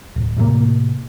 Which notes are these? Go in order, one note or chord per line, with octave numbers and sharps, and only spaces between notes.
D1
A2 C3 D#3 A#3